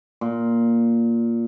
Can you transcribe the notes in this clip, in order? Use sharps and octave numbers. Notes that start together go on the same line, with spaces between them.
A#2